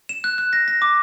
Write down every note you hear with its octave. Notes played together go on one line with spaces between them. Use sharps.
E7
F#6
F#6
A#6
A#6
D6